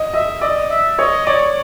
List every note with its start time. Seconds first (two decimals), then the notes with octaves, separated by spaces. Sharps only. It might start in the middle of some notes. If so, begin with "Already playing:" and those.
Already playing: D#5
0.14 D#5 E5
0.41 D5 D#5
0.70 E5
0.99 C#5 D#5
1.27 C#5 D5